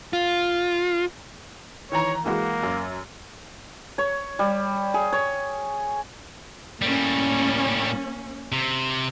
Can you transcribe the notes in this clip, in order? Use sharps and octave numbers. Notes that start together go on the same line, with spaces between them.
F4
D#3 E3 C#5 A#5
E3 G#3 A#3 F#4
F#2
C#5
G3
G#4
C#5
A2 G3 A#3 C#4
C3